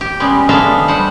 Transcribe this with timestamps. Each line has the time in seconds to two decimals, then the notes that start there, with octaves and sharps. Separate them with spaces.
0.01 G4
0.20 C#3 G3 G#3 B3
0.49 G#3 B3 D4 A4 E5 F5
0.88 G3 C5 F#5